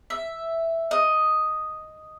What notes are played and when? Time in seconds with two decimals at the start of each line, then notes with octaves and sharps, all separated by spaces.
0.10 E5
0.91 D#5